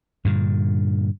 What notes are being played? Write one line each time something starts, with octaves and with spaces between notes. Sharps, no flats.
G2 A#2 D3